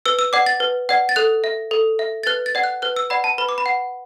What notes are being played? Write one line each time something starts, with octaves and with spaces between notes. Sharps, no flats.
B4 E6
E6
D5 F#5 D6
A6
B4
D5 F#5
A6
A4 F#6
E5
A4
E5
A6
B4 F#6
A6
D5 F#5
F#6
B4 F#6
E6
D5 F#5 B5
A5
B4 B5
D6
B5
F#5